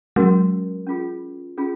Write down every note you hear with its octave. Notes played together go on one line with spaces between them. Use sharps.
F#3 G#3 C#4 F#4 A#4
C#4 F4 G#4
C#4 F4 G#4